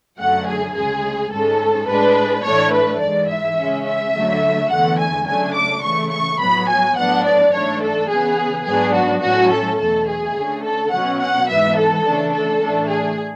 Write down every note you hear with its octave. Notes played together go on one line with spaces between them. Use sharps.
F#2 D3 F#3 A3 F#5
G#4
D2 C#3 G#3 G#4
G#2 G#3 C#4 A4
A2 G#3 D4 B4
A2 E3 A3 D4 C#5
B4
G#2 E3 G#3 D5
E5
C#3 G#3 C#4
E5
D2 D3 F#3 A3
E2 D3 A3 F#5
G#5
C#3 F#3 A3 D4 G#5
D6
C#3 E3 A3 C#6
C#6
A2 F#3 B3 B5
G#5
A2 F#3 B3 D4 F#5
D5
G#2 E3 A3 D4 C#5
A4
C#3 E3 B3 G#4
G#2 F#3 B3 D4 G#4
F#4
A2 F#3 C#4 F#4
A4
E2 B2 A3 A4
G#4
D2 D3 A3 C#4
A4
B2 F#3 C#4 F#5
F#5
G#2 E3 B3 E5
A4
C#3 E3 A3 D4
A4
A2 E3 A3 D4
G#4